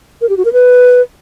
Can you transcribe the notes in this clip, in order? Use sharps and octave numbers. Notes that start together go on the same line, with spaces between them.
A#4
G4
F#4
A#4
B4